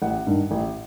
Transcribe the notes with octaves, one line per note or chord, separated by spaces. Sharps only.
A1 F#5
G2 D#3
A1